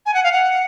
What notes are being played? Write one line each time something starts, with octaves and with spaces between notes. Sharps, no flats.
G#5
F#5
F5
F#5